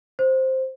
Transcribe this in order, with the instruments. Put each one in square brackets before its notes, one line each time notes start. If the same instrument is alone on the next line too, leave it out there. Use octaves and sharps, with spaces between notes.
[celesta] C5